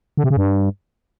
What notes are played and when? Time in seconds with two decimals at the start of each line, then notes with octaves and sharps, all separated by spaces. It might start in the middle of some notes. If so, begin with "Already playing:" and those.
0.17 D3
0.24 C3
0.30 C#3
0.37 G2